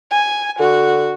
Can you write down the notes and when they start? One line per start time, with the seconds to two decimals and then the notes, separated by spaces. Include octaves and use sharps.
0.11 G#5
0.59 D3 F#4